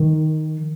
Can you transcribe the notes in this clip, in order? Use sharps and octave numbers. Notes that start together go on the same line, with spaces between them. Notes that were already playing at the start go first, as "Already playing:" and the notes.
Already playing: D#3